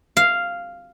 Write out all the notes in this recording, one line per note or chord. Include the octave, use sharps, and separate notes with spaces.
F5